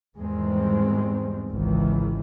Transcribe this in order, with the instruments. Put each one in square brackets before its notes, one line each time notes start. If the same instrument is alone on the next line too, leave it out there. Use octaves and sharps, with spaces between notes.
[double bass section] E2 G#2 D#3 G3 G#3 C4
G#1 C#2 D#3 E3